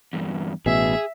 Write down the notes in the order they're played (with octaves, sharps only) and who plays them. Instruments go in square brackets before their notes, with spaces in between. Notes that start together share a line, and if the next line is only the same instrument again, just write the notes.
[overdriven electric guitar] E2 G2
[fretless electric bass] A1 B2 [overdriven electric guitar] G#4 [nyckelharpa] E5